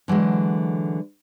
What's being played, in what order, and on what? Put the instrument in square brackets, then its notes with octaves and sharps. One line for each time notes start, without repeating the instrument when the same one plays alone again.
[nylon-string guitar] D3 E3 F#3 G#3